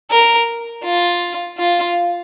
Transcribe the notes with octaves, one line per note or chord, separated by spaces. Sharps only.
A#4
F4
F4